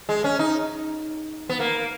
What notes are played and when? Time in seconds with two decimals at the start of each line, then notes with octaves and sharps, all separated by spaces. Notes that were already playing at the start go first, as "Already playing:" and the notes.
0.09 G#3
0.24 C#4
0.39 D#4
1.49 B3
1.60 A#3